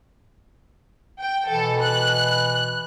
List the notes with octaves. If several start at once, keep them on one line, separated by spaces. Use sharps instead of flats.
G5
B2 E3 A4
F#6